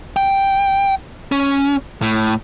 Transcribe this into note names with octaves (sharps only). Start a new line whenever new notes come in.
G5
C#4
A2